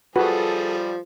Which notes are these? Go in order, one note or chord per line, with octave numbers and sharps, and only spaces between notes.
F3 G3 F#4 G#4 A4 B4